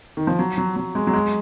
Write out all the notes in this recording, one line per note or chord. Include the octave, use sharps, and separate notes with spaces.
D#3
F3
F#3
F#3
F#3
G#3
F#3
G#3